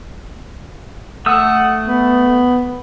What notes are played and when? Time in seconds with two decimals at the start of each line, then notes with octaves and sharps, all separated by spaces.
1.26 A3 F#5 D#6 E6
1.87 B3